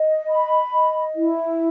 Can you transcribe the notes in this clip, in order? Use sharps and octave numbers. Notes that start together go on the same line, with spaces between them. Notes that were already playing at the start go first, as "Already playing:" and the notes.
Already playing: D#5
B5
D#5
E4